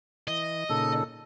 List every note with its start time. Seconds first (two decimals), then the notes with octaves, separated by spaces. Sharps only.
0.28 E3 D#5
0.69 A#2 C#3 D#4 A4